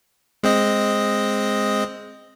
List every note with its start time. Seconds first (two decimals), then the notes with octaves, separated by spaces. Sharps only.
0.43 G#3 C4 D#5